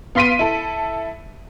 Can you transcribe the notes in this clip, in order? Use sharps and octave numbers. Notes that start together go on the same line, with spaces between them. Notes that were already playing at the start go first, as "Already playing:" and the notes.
B3 F5 C6 B6 D7 D#7
E4 A4